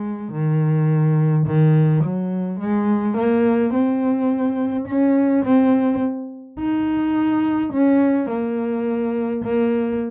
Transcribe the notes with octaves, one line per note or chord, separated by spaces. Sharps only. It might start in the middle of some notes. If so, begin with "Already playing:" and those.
Already playing: G#3
D#3
D#3
F#3
G#3
A#3
C4
C#4
C4
D#4
C#4
A#3
A#3